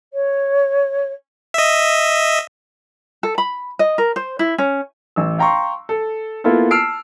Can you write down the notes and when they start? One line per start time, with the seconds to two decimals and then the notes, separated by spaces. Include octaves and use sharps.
0.13 C#5
1.54 D#5 E5
3.23 A4
3.38 B5
3.79 D#5
3.98 A#4
4.16 C5
4.39 E4
4.58 C#4
5.16 A1 E6
5.38 F5 G5 A#5 C6 C#6
5.89 A4
6.44 A#3 B3 E4 F4 A4
6.71 A5 E6 F6 C7 D7